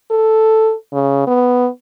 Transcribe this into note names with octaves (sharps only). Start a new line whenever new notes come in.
A4
C#3
B3